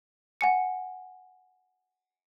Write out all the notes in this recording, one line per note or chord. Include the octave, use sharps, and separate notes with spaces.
F#5 G#5 C#7